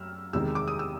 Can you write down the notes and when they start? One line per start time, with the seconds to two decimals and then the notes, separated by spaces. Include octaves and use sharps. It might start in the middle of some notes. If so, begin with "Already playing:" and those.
Already playing: F#2 E6 F6
0.33 E2 C3 D#3 G#3 E6
0.55 D6
0.68 D#6
0.79 E6